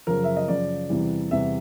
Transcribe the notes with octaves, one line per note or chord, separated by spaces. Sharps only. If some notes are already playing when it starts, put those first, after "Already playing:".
F#2 C#3 F3 A#4
E5
D#5
F#2 C#3 F3 D5
E2 C3 E3 G3
E2 C3 E3 G3 E5